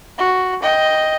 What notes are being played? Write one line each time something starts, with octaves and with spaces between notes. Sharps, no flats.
F#4
D#5 G5